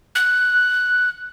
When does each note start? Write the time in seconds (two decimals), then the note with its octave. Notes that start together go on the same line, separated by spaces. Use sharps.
0.15 F#6